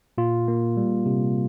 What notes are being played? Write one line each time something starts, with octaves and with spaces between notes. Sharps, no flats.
A#2 F4
A#3
G3
C3